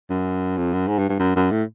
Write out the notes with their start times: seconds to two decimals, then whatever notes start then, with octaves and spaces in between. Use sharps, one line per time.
0.10 F#2
0.57 F2
0.73 F#2
0.88 G#2
0.98 G2
1.09 G2
1.19 F#2
1.36 F#2
1.51 A2